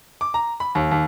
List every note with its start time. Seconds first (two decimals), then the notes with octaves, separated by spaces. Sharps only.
0.21 D6
0.34 A#5
0.60 B5
0.75 D#2
0.91 D#2